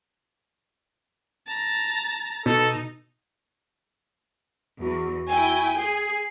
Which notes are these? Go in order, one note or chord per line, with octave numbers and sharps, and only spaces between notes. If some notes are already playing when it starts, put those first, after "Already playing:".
A5 A#5
B2 D#4 A4
E2 F#4
E4 G5 G#5
G#4 G#5 C7